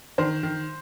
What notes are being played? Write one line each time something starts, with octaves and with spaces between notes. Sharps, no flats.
D#3 C5
D#3